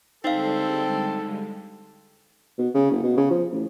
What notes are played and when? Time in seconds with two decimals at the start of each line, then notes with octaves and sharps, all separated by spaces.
0.24 D3 G3 G#3 C4 D#4 A4 F5
2.58 B2
2.74 C#3
2.91 F#1
3.03 B2
3.17 C#3
3.30 F3
3.52 A1